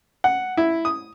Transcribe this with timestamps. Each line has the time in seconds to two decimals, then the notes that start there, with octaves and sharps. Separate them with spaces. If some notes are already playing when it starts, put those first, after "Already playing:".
0.24 F#5
0.57 E4
0.85 D#6